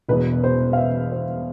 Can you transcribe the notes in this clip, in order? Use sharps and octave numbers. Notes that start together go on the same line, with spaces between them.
E1 E2 B2 B4
C5
F5
E5
C5